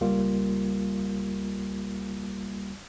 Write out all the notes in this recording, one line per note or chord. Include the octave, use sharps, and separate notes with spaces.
C#2 G3 A#3 F4